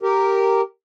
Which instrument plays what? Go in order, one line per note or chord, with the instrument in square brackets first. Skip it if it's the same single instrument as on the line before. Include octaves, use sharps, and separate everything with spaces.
[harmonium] G4 A#4